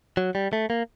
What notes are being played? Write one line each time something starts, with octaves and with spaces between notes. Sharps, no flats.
F#3
G3
A3
A#3